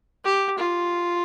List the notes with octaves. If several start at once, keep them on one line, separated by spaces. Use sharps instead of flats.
G4
F4